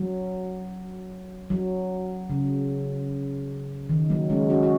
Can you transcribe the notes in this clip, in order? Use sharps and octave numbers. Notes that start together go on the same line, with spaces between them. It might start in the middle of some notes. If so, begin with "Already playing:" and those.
Already playing: F#3
F#3
C#3
D#3
F#3 A#3
G#3 C#4
C#4 F#4
F#4